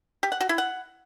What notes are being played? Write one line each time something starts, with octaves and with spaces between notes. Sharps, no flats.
G4
F#5
F#4
E4
F#5